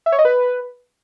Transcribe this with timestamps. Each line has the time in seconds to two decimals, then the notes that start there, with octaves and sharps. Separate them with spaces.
0.06 E5
0.12 C#5
0.19 D#5
0.25 B4